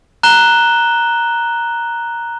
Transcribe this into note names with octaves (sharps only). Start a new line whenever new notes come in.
A#5 F#6 E7 G7